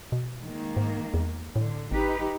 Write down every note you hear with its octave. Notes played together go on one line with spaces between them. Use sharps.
B2
D#3 G#3 A#3
G#2
E2
A2 D3
G#1 D#4 G4 B4